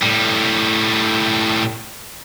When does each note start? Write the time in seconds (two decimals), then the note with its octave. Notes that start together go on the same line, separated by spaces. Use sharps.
0.03 A2 G3